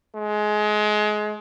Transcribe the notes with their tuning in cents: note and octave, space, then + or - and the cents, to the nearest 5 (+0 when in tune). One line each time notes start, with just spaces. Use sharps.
G#3 +25